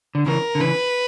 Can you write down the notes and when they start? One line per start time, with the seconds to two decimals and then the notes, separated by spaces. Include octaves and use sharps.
0.15 D3
0.26 C#3 E3 A#4
0.55 D3
0.60 C#3 E3 B4